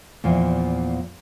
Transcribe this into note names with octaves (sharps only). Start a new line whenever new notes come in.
E2 A#2 F3